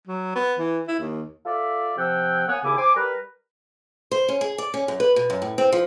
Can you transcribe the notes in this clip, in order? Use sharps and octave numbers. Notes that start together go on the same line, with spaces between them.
F#3
B3
E3
E4
D#2
F4 A4 D5 E5
C3 F3 F#5 G5 E6
A#3 B3 C#5 F#5 G#5
D#2 C#3 E4 G#5 D6
C5 G#5 C6 D6
G3 A#4 B4
C5
C#4
G#4
D5
C#4
F#2
B4
B2
F#2
A2
C4
F3